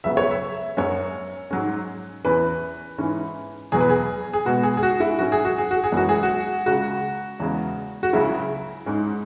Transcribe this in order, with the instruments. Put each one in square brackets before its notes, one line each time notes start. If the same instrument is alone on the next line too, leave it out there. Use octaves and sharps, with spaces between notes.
[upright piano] C#2 C#3 F#3 B3 E5
C#5
E5
F#2 F#3 C#4 C#5
G#2 F#3 C#4
E2 E3 C#4 B4
G#2 E3 C#4
E2 B2 F#3 B3 G#4
B4
G#4
G#4
B2 G#3 B3 F#4
G#4
G#4
F#4
E4
G#2 F#3 C#4 F#4
G#4
F#4
G#4
F#4
G#4
F#2 E3 G#3 F#4
G#4
F#4
C#2 C#3 G#3 F#4
E2 C#3 G#3
F#4
C#2 C#3 F#3 C#4 E4
G#2 G#3 C#4